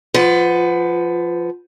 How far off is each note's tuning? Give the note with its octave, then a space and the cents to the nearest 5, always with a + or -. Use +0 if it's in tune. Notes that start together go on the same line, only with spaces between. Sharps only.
F3 +0 B4 +25 F#5 +0